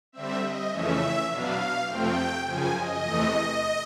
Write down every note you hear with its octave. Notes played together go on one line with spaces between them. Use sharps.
D3 G3 C4 E5
D#5
F2 C#3 E3 A3 C#4 E5
B2 F#3 B3 D4 F5
F2 C3 F3 A3 C4 G5
F#2 C#3 F3 G#5
D#5
E2 C3 E3 A3